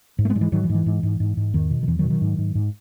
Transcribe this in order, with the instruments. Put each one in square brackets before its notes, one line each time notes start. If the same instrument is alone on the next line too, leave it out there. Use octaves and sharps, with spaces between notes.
[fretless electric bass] G#2
A3
G#3 B3
G#2 F#3
E3 G#3
G#2 D#3 F#3
E3
G#2
E3
G#2
G#2
G#2
G#2
E2 D#3
B2
D#3
E2 E3
D#3 F#3
B2
D#3 F#3
G#2
G#2
G#2